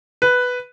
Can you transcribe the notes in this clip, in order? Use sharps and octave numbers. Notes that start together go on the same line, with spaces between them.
B4